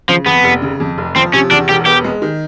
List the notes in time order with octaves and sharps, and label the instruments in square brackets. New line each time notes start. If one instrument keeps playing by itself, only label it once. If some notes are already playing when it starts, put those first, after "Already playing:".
[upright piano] C#3 [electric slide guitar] F3
[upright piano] F2 [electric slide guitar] B3
[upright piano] F1
C#3
F2
F1
[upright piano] F3 [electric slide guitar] C4
[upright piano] C3 [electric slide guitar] C#4
[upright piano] E2 [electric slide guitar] D4
[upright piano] E1 [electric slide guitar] G4
[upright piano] B3 [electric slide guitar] G4
[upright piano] G#3
D#3